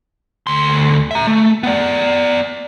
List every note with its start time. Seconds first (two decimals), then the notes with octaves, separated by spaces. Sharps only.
0.47 D2 C6
1.11 E5 A#5
1.27 A3
1.63 B3 D5